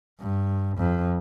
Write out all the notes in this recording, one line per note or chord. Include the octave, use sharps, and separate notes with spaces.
G2
F2